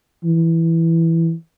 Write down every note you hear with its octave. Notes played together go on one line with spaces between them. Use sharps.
E3